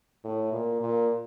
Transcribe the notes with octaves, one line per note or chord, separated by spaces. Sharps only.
A2
A#2
A#2